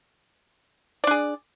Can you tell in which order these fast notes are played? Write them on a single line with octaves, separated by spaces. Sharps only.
D5 D4 G#4